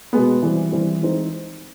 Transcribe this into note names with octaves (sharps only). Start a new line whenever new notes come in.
B2 G#3 B3
E3 G3 C4
E3 G3 C4
E3 G#3 C4 D#4